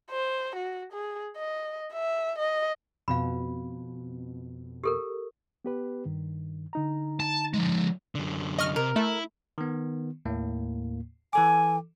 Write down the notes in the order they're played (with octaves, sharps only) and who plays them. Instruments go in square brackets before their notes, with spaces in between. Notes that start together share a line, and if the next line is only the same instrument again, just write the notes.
[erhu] C5
F#4
G#4
D#5
E5
D#5
[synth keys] F2 B2 [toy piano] F5 B5
[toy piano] G4 A4 A#4
[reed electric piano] B3 G4 B4
G2 D#3
D3 D#4 A#5
[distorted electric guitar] A5
F3 G#3
F#2 D3
[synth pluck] D#5 C#6 F6
[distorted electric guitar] C3 [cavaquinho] A#4
[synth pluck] A3 [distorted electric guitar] E4
[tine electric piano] D#3 B3
D#2 A2 A#3
[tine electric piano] E3 A4 D6 [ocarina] G#5